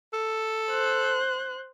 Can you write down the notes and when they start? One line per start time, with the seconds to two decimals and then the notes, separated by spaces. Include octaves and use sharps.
0.13 A4
0.70 C5 F#6